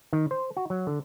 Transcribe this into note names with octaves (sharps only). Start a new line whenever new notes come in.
D#3
C5
F#4
F#3
D3